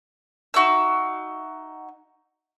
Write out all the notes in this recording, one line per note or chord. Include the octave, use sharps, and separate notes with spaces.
D#4 F#4 E5 E6